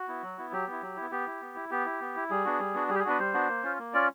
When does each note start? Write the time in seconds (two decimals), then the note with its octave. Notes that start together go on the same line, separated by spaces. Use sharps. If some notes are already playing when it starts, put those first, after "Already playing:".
Already playing: F#4
0.08 B3 E4
0.23 F#3
0.38 B3 E4
0.52 F#3 G4
0.67 B3 E4
0.82 F#3
0.96 B3 E4
1.11 B3 G4
1.26 E4
1.41 B3
1.56 E4
1.71 B3 G4
1.85 E4
2.01 B3
2.16 E4
2.30 G3 G#4
2.45 B3 D4 F#4
2.60 G3
2.74 B3 D4 F#4
2.89 G3 G#4
2.95 G4
2.99 G#4
3.05 B3 D4 F#4 B4
3.19 G3 C5
3.33 B3 D4 F#4
3.49 A#3
3.63 C#4 F4
3.79 A#3
3.94 C#4 F4 D5